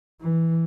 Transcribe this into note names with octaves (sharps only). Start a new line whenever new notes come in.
E3